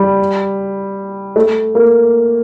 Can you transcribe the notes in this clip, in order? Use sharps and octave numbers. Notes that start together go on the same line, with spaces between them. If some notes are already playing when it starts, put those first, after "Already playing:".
Already playing: G3
A3
A#3